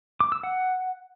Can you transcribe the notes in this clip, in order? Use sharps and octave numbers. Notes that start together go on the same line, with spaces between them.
D6
E6
F#5